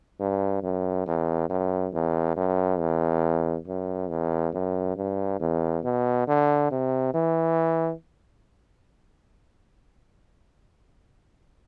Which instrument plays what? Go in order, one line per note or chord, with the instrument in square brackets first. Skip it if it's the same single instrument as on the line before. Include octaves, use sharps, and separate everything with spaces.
[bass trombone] G2
F#2
E2
F#2
E2
F#2
E2
F#2
E2
F#2
G2
E2
B2
D3
C3
E3